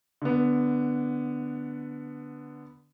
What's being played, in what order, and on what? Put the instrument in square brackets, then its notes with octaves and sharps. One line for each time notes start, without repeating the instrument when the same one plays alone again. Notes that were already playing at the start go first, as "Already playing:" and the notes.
[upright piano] D3 B3